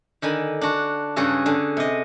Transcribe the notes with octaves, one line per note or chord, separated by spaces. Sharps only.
D3 D#3 G#5 B5
D4 F#4
G2 C#3 F#4 G#4 A4
D3 G#4
C3 D#5